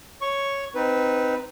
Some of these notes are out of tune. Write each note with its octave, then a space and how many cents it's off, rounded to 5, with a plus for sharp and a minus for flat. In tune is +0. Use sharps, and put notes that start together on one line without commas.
C#5 +0 C#6 +0
C4 -15 D#4 +0 B4 +0